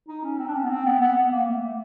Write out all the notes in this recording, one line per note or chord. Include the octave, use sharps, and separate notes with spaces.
D#4
C#4
C4
D4
C#4
B3
C4
B3
B3
B3
A#3
A3
A3